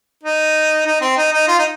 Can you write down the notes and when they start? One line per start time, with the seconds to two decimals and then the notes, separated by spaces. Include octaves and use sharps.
0.23 D#4
0.86 D#4
1.01 C4
1.17 D#4
1.32 D#4
1.48 F4
1.58 D#4